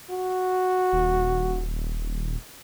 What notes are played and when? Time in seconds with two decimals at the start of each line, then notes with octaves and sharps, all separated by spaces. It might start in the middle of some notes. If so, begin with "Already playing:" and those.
0.10 F#4
0.93 D#1